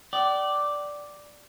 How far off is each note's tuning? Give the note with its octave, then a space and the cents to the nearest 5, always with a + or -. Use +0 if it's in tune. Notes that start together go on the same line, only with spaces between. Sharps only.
D5 +0 G5 -40